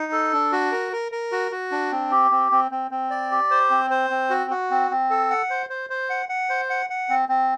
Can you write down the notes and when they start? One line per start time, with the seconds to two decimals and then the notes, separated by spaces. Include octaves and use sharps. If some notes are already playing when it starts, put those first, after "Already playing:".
Already playing: D#4
0.12 A4
0.33 D4
0.52 F#4
0.72 A#4
0.93 A#4
1.12 A#4
1.32 F#4
1.51 F#4
1.72 D4
1.92 C4
2.11 G4
2.31 C4
2.52 C4
2.71 C4
2.91 C4
3.10 D5
3.31 G4
3.51 C5
3.70 C4
3.90 C5
4.10 C4
4.30 F#4
4.50 F#4
4.70 C4
4.91 C4
5.10 A4
5.30 F#5
5.50 C5
5.70 C5
5.90 C5
6.10 F#5
6.29 F#5
6.50 C5
6.70 F#5
6.90 F#5
7.09 C4
7.29 C4